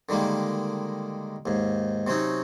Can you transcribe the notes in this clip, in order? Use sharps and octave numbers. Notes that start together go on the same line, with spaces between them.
D3 D#3 G3 G#3 A#3
D#2 G#2
C3 F#3 C4 C#4 D#4